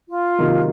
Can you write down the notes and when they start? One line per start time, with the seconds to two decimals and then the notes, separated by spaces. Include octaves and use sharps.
0.09 F4
0.38 C3 D#3 F#3 A#3 D#4